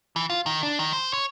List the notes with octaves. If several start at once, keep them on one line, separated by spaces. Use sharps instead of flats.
E3
F4
D#3
D4
D#3
C5
C#5